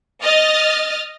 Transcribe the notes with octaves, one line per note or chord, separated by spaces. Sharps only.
D#5 D#6 F6 A6